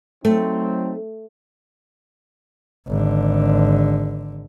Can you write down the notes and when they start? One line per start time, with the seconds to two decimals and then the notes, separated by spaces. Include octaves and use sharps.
0.25 F#3 A3 C4 D#4
2.88 G#1 D3